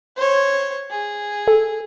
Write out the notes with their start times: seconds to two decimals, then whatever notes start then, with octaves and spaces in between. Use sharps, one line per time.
0.16 C5 C#5
0.90 G#4
1.48 A4